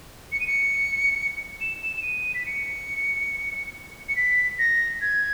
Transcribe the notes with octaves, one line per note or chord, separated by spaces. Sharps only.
C#7
D#7
C#7
E7
E7
E7
D#7
B6
C#7
C#7
B6
A#6
G#6